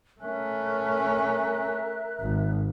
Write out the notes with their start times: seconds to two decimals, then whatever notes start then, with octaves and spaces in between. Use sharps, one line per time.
0.21 A3 C#4 A#4 E5 F#6
2.20 G#1